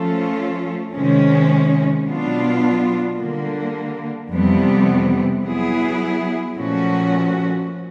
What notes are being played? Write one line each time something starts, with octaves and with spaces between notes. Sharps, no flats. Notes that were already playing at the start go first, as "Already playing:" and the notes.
Already playing: F3 A3 C#4 F4 A4
C3 D#3 G#3 C#4
B2 F#3 B3 D4 F4
D3 G3 A#3
F2 C3 E3 G3 B3
F#3 B3 E4 G#4
A#2 F3 A3 C#4 F#4